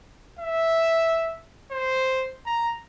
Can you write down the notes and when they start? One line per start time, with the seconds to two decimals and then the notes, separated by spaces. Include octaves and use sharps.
0.39 E5
1.72 C5
2.46 A#5